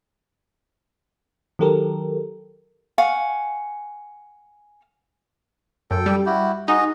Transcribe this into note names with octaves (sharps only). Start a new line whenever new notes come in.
D#3 F#3 G4 A4 A#4
F5 F#5 G#5 C#6
F#2 A4 G5
G3
E4 F#4 G4
D#4 F#4 G#4 D#5